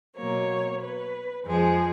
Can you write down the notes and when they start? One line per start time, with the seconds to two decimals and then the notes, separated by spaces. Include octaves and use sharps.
0.16 B2 F#3 A#3 C#5
0.81 B4
1.45 F2 F3 G#3 G#4